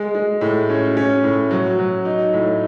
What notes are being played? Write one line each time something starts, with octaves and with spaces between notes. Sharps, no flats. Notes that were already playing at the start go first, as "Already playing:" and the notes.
Already playing: G#3
G#3
A2
C#4
C#4
A2
F#3
F#3
D#4
A2